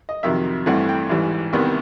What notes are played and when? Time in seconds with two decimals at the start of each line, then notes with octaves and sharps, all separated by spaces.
0.09 D#5
0.23 F2 C3 D#3 F#3 E5
0.66 A1 G2 E3 A3 C4 F#5
0.89 G5
1.09 A1 G#2 E3 G3
1.53 C2 C3 D#3 G3 B3